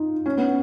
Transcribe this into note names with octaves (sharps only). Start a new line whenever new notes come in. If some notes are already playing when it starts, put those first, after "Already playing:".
Already playing: D#4 F4
C#4
B3